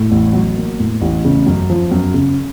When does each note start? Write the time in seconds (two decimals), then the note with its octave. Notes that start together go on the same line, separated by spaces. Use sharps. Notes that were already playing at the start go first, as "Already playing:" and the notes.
Already playing: A2
0.11 A1
0.33 F#3
0.56 A#3
0.79 A2
1.01 A1
1.25 C#3
1.46 F#2
1.70 F3
1.91 F#2
2.14 C#3